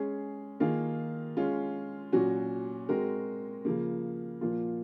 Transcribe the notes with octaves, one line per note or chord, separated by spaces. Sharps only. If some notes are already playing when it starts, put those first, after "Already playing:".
Already playing: G#3 C#4 G#4
D#3 A#3 F4 G#4
G#3 C#4 F4
A#2 F#3 C#4 F#4
G#3 C4 F#4 A#4
C#3 F3 A#3
A#2 F3 A#3 F4